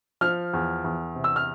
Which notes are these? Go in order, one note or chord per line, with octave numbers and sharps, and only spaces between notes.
F3 F6
E2
E2
C3
E6
F6